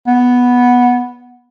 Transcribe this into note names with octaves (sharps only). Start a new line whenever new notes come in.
B3